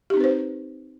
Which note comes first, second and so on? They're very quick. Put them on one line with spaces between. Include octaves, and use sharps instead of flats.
G4 D#4 C4 B4 C5